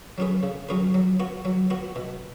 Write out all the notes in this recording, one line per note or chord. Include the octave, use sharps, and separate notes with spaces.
F#3 C#4 G#4 B4
C#3
F#3 C#4 G#4 B4
F#3
B3 F#4
F#3
B3 F#4
B2